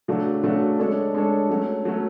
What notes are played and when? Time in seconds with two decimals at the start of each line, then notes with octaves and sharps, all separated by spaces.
0.08 C#3 F#3 A3 D4 F#4
0.43 C#3 F#3 A3 D4 F#4
0.79 G#3 D4 A4 C#5
1.14 G#3 D4 A4 C#5
1.49 F#3 A3 C#4
1.85 F#3 A3 C#4